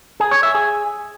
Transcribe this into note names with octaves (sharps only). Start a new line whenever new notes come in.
G#4
C#5
E5
G#4